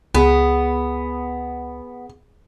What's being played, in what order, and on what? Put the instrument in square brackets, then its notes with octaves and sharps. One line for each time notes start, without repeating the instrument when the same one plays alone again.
[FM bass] C#2 [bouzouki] B3 [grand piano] G#4